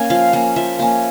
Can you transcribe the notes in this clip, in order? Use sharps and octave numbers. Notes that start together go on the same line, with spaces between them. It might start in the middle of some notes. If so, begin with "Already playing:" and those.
Already playing: A#3 C#4 G#5 A#5
F3 F5
A#3 C#4
F3 E5
A#3 C#4